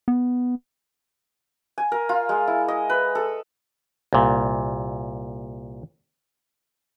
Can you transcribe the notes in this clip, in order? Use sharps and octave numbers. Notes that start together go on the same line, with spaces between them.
B3
G#5
A#4
F4
G#3
E4
D#5
B4
A4
C2 A#2